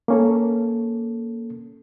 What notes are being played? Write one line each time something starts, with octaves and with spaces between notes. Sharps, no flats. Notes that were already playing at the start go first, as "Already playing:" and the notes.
A#3 C#4 A4